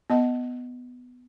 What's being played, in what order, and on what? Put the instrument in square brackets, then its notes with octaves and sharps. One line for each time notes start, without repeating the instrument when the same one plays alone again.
[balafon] B3 D#5 F#5